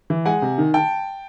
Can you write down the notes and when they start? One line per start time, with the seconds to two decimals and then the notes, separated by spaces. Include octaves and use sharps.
0.10 E3
0.26 G#3 F#5 G#5
0.42 C3
0.58 D#3
0.74 G5 A5